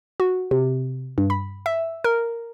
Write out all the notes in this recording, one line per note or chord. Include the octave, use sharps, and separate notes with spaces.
F#4
C3
G2
B5
E5
A#4